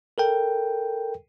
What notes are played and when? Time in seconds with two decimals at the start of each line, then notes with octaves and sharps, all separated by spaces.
0.18 A4 A#4 G5